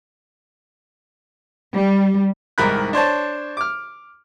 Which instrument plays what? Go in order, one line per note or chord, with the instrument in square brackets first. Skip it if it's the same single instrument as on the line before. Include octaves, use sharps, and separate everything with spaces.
[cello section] G3
[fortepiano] C2 G#2 D#3 A#4 B5 F#6
D4 C5 C#5 A5
D6 F6